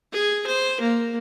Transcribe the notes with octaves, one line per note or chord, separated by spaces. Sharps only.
G#4
C5
A#3